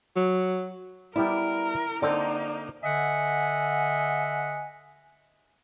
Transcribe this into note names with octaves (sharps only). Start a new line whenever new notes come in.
F#3
G3 B3 E4 A#4 D5
D3 A#3 C4 D#4 A#4 D5
D3 D#5 E5 F#5 G#5